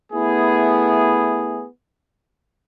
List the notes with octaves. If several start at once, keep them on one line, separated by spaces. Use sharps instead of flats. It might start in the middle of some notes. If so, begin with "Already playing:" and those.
A3 B3 E4 G#4